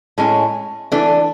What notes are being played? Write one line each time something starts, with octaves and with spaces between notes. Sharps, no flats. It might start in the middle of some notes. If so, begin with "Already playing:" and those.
A2 G#3 C#4
E3 A3 D4